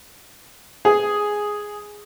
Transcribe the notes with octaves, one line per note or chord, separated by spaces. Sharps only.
G#4